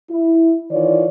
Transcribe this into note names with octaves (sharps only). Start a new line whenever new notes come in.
E4
D#3 E3 F4 C#5 D5